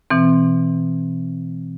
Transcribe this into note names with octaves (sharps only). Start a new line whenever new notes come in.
B2 E3 C4